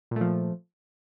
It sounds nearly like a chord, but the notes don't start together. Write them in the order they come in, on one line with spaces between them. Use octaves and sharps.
A#2 A3 F3